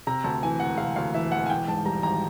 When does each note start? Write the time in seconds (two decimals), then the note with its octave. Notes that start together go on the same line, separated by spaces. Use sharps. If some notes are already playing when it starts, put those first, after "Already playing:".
0.07 C3 A#5
0.24 D2 A5
0.43 E3 G#5
0.60 E1 F#5
0.78 C3 F5
0.96 D2 F5
1.14 E3 E5
1.32 E1 F#5
1.46 G#5
1.50 E3 G5
1.68 G#2 A5
1.86 G3 A#5
2.03 G#1 A#5